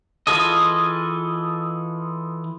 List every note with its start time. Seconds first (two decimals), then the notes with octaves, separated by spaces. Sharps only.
0.27 E3 F4 G#4 A4 D#5